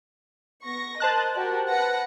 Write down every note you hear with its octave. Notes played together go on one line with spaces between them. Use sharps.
B3 C#6 A#6
A#4 C5 D#5 A5 F#6
F#4 G4 A#4
B4 F#5 A#6